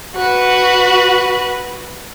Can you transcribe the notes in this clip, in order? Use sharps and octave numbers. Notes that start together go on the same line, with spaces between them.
F#4 B4